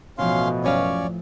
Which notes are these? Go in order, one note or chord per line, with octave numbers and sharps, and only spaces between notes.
A1 B2 F3 C#4 F5 C6
F#2 C#4 C#5 D5 F5